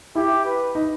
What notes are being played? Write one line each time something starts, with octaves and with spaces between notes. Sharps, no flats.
E4 G4
B4
D#4